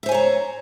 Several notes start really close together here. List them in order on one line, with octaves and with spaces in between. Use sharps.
E5 C5 G#5 C#5 A#5